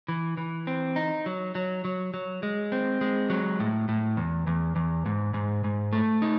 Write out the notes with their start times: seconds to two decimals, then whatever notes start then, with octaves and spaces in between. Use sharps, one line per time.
0.08 E3
0.37 E3
0.67 C4
0.96 D#4
1.26 F#3
1.55 F#3
1.85 F#3
2.14 F#3
2.43 G#3
2.72 C4
3.01 G#3
3.30 F#3
3.60 A2
3.89 A2
4.17 E2
4.47 E2
4.76 E2
5.06 G#2
5.34 G#2
5.64 G#2
5.93 A3
6.22 D#4